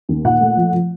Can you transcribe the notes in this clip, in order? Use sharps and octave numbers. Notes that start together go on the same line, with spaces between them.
D#2
A#2 F#5
A3
F3
F3